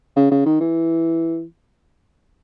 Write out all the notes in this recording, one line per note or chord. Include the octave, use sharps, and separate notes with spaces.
C#3
C#3
D#3
E3